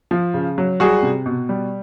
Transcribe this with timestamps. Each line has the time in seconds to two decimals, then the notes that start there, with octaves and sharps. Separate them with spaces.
0.11 F3
0.34 C#3
0.58 F#3
0.80 G3 F#4 G#4
1.03 C3
1.26 B2
1.49 G3